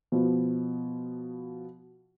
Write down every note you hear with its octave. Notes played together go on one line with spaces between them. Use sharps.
B2 F3 B3